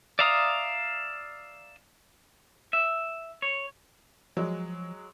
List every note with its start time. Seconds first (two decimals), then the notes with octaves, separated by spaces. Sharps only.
0.19 D5 E5 F5 A#5 D#6
2.73 E5
3.42 C#5
4.37 F3 F#3 G#3